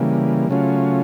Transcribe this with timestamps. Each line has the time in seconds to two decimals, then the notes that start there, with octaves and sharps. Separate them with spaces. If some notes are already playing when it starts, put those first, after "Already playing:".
Already playing: C#3 E3 G3 A#3
0.50 C#3 F#3 A3 C#4 F4